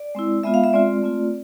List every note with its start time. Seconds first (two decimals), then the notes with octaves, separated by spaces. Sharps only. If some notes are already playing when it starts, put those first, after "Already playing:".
Already playing: D5
0.15 G#3 C4 E4
0.43 G#3 B3 F4 E5
0.54 F5
0.64 E5
0.73 G#3 C4 F4 D5
1.02 A3 C4 F4